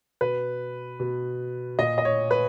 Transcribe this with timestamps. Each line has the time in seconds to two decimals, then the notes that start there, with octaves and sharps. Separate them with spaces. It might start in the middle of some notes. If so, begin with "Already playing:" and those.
0.21 B2 B4
1.00 B2
1.79 A#2 D#5
1.98 D#5
2.05 C#5
2.31 B4